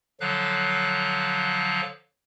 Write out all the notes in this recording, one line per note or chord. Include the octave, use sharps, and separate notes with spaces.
D3 F3 F#3 F5 F#6